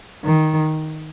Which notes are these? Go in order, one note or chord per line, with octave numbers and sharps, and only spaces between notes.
D#3